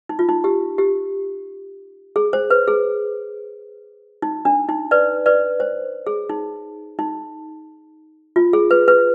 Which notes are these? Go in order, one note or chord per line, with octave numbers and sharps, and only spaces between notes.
D#4
F4
D#4
G4
G4
G#4
C5
B4
G#4
D#4
D4
D#4
B4 D5
B4 D5
C5
G#4
D#4
D#4
F4
G#4
B4
B4